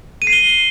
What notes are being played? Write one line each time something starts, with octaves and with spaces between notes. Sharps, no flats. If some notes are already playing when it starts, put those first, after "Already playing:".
D#7
C7
G7